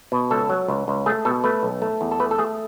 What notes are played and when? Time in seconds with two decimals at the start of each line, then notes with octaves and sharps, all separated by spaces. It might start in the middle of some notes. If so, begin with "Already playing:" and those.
0.12 B2
0.31 C#2 A4
0.50 F#3
0.68 C#2
0.88 C#2
1.06 A3 G#4
1.25 B2 A4
1.44 A3 B4
1.63 B1
1.82 A3
2.01 E2
2.11 A4
2.20 A3 B4
2.31 A4
2.38 A3 G#4